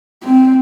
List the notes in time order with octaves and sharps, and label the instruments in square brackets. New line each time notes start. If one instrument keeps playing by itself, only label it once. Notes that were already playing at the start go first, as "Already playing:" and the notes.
[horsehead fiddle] C4